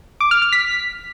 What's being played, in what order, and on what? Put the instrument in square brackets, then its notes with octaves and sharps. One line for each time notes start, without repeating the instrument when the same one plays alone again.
[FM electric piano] D6
F6
F6
B6